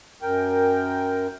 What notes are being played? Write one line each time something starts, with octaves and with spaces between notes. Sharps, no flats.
F#2 A#4 G5